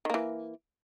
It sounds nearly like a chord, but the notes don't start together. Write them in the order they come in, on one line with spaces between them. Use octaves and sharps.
D#3 A#3 E3